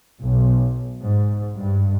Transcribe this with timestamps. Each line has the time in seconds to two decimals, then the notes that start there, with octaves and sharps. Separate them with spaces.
0.21 B1
1.02 G#2
1.55 G2